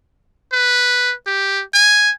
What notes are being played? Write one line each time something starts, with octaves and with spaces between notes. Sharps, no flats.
B4
G4
G#5